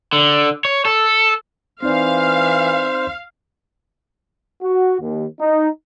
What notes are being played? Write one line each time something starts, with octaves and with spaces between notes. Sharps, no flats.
D3
C#5
A4
E3 C4 D#4 C5 D5 F5
F#4
D#2
D#4